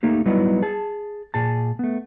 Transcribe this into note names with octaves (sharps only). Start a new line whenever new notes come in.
A3 A#3 D#4 G4
F#3 G3 B3 D#4 E4
G#4 A5
A#2 G#4 A5
A3 B3